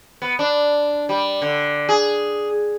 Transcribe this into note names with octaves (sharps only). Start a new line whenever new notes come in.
B3
D4
G3
D3
G#4